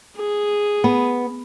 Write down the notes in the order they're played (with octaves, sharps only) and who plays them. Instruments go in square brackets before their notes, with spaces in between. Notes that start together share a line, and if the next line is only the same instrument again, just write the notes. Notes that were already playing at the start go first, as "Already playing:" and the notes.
[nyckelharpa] G#4
[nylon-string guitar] B3